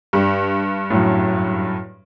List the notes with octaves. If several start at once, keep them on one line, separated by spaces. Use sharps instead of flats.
G2 G3
F#2 A2